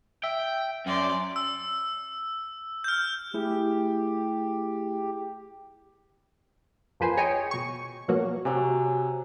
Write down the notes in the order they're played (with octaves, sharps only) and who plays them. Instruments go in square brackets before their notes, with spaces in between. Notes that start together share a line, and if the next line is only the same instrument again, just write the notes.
[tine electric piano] E5 [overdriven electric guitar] G5
[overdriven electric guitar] F#2 [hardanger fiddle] D5 C6
[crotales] E6
F6 G6
[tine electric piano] A3 E4 G#4 [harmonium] G4
[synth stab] F2 F3 A#3 B4 C5 G#5
G#4 C#5 D#5 G5 G#5
B2 C#6
B2 F3 F#3 A#3 C#4 F#4
[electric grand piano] C3 [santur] F#3 G#5